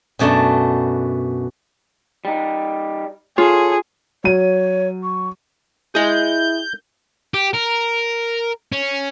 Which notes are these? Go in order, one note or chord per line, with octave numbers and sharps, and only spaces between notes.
F#2 B2 A3 D4 A5
G3 D#4
F4 G#4 A4 C#5
F#3 C#5 D#7
C#6
E4 G#4 D#5 G6
G4
A#4
C#4